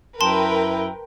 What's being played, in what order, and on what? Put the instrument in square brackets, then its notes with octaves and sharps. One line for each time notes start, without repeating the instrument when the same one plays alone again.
[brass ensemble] F#2 E4 [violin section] A#4 B4 G5 [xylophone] A5 C6